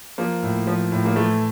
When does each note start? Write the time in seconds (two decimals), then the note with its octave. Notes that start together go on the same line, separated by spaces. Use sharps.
0.18 F3 A#3
0.43 A2
0.67 F3
0.92 A2
1.05 A#3
1.16 E3 A3